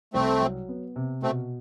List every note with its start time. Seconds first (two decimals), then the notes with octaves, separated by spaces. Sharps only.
0.13 C2 A3 C4
0.41 F#3
0.69 B3
0.96 C3
1.22 B2 A3 C4